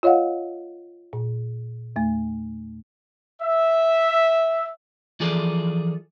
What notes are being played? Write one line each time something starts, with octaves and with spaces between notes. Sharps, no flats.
F4 C#5 D#5 F5 F#5
A#2
E2 A3
E5
E3 F3 F4 G#4 A4 D5